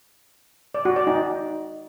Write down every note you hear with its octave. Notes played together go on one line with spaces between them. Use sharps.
D5
F#4
D5
D#4